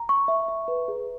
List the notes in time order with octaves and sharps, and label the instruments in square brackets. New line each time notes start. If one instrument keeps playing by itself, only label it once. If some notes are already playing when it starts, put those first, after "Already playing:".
Already playing: [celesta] A#5
C#6
E5
E5
B4
G#4